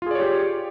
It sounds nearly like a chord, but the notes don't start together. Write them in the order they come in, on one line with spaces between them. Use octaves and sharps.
F4 G#4 D5 C#5 G4